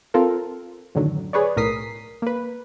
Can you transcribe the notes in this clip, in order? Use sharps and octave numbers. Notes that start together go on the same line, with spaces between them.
C4 F4 A4 A#4
F#2 A2 D3 D#3 F#3
G#4 B4 C#5 D5
B1 A2 A#4 D#6 B6 C7
A#3 B4